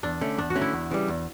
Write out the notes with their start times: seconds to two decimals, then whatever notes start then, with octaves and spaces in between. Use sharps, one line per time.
0.03 E2 D4
0.21 D3 A3 C#4
0.38 E2 D4
0.50 F#4
0.55 D3 A3 C#4
0.61 E4
0.73 E2
0.91 C#3 E3 G3
1.08 E2